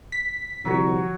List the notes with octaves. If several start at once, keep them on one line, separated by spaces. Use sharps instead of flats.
B6
C2 D3 F3 F#3 F#4 C#5